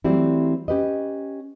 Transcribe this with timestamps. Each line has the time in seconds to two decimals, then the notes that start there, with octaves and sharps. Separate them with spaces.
0.04 E3 F#3 G3 A3 C4 E4
0.68 C#4 G4 B4 D#5